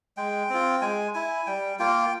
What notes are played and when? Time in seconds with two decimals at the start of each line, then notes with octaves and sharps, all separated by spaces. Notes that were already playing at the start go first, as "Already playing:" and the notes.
0.17 G#3 G5
0.50 C4 F4
0.82 G#3 G#5
1.14 E4 G#5
1.47 G3 G5
1.79 A#3 F4 G5